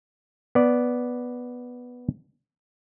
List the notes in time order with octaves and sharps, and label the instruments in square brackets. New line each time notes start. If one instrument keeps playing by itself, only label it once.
[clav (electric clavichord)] B3 D5